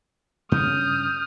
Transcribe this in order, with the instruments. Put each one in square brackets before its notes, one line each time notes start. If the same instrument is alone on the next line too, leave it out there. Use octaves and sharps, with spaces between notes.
[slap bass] G2 C#3 C#4 [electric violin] D#6 F6 [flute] G6